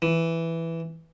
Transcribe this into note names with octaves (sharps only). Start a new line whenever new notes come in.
E3